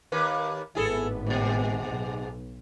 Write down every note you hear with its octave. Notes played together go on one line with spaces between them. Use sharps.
D#2 A#3 B4
G#1 A2 B3 E4 G#4 A4
G#2 B2
B1